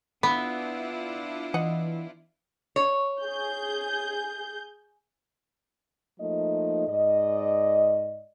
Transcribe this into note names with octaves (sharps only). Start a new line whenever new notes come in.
B3 D4 E4 F4 B5
E3 D#5 F#5
C#5
G#4 G6
F3 A3 A#3 D#4 D#5
G#2 D5 D#5